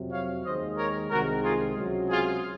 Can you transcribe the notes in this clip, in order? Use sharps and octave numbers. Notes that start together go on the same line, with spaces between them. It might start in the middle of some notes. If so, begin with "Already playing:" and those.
Already playing: F2 C3 F#3
C#5 F5
D#2 D#3 G#3 C5 D#5
A#4 C#5
C2 C3 D#3 G#3 F#4 A#4
F4 G#4
C#2 C3 F#3
F4 G#4